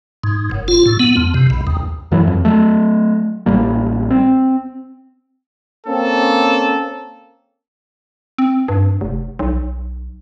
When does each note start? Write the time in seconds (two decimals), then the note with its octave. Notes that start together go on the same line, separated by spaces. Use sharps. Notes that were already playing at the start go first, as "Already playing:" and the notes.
0.24 G#2
0.51 F#1
0.68 F4
0.86 A2
0.99 B3
1.16 F2
1.34 C3
1.50 B1
1.67 D#2
2.11 F#2 E3 F#3
2.27 F2
2.45 F#3 A3
3.46 A1 G3 A#3
4.11 C4
5.87 A#3 C4 C#4 A4
8.38 C4
8.68 G2
9.01 F1
9.39 B1